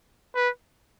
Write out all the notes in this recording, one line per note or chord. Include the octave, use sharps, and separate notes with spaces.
B4